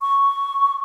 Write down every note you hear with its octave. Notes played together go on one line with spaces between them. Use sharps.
C#6